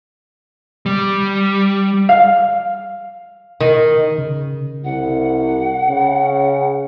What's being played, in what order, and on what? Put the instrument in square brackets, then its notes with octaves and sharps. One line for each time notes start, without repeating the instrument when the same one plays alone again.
[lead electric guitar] G3
[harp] F5
[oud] D#3
[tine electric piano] C#3
[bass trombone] C2 [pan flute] F#5
[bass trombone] C#3